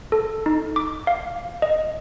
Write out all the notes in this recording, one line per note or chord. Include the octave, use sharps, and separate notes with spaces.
A4
D#4
D6
F5
D#5